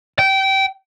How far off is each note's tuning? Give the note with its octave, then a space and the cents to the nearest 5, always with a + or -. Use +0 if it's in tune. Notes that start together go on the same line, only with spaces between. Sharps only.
G5 -20